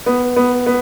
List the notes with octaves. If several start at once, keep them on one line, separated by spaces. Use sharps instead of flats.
B3
B3
B3